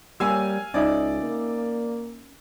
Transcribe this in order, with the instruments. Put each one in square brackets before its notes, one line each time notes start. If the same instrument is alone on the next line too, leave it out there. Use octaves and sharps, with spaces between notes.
[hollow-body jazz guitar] G3 A#3 C#5 [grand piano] F5 G#5 E6
[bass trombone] C#2 [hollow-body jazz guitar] C#4 D#4 E5 [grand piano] D5
[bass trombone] A#3